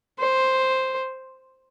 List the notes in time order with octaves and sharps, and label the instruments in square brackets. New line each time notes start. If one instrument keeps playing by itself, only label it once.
[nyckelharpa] C5